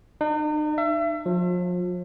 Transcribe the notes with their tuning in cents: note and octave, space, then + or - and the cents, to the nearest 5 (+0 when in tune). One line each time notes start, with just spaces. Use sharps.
D#4 -45
E5 +35
F3 +35